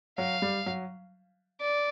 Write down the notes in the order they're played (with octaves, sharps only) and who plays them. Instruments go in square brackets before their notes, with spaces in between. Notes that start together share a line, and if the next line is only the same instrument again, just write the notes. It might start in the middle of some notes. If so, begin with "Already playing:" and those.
[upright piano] F#3 [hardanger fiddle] F5
[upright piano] G3
F#3
[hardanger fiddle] D5